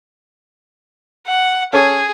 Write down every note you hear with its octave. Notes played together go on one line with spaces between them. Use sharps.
F#5
C#4 G#4 A4 C#5